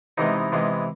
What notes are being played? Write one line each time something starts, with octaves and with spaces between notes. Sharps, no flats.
C3 E3 G#3 B3 D#4
C3 E3 G#3 B3